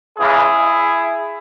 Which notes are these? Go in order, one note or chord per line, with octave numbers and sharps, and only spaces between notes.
C#2 C#3 E3 G#3 E4 G#4